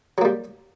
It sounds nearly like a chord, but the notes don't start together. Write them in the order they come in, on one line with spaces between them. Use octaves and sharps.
F#3 A#3 G3